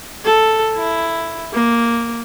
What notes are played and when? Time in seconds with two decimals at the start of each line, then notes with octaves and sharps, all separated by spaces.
0.25 A4
0.76 E4
1.53 A#3